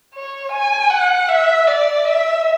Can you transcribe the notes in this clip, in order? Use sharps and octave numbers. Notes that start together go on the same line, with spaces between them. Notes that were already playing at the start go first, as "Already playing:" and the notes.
C#5
G#5
F#5
E5
D5
E5